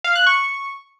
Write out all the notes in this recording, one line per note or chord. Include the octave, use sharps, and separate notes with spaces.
F5
F#6
C#6